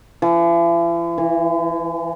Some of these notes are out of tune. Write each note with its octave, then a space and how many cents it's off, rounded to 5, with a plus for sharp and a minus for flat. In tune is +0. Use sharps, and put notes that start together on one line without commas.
E3 +45
E3 -5